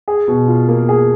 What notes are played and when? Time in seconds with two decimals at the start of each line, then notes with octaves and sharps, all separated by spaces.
0.08 G#4
0.28 B2
0.48 F4
0.68 A#3
0.89 G#4